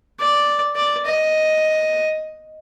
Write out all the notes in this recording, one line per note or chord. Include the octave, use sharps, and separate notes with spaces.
D5
D5
D#5